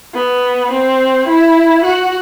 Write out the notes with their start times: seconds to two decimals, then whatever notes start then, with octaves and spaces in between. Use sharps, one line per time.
0.14 B3
0.71 C4
1.28 E4
1.84 F#4